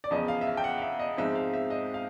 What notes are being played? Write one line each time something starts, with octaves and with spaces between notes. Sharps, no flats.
D5
E2 C#3 F3 D#5
F5
E5
F5
G5
F#5
F5
E5
D#5
G#2 F3 G#3 C4 D#4 E5
F5
E5
D#5
F5